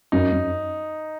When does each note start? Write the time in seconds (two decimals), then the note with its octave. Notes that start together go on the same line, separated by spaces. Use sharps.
0.12 F#2 D#4
0.32 F#2